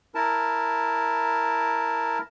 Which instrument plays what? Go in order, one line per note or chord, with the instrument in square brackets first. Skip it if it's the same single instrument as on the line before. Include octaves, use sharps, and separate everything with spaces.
[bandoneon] E4 A#4 A5